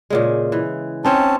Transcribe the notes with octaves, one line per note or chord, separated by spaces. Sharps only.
A#2 C#3 G#3
E3
C4 C#4 D#4 C5 C#5 A5